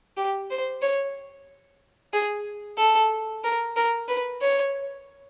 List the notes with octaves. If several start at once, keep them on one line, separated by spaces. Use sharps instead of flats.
G4
C5
C#5
G#4
A4
A#4
A#4
B4
C#5